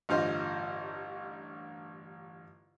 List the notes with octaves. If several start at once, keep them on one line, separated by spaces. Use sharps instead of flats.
A1 G2 D3 F4 C5 D#5